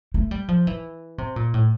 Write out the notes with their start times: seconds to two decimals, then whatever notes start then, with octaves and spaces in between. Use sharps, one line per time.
0.14 A3
0.31 G3
0.48 F3
0.67 E3
1.18 C3
1.36 A#2
1.54 A2